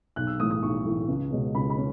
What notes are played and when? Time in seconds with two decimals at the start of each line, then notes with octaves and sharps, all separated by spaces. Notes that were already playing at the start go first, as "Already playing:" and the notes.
0.16 B1 F#6
0.27 E6
0.39 A2 E3 A3 D#6
0.51 D#6
0.62 B1 C#6
0.85 A2 E3 A3
1.08 C#2
1.31 B2 G#3 C#4
1.55 C#2 B5
1.70 B5
1.77 C#4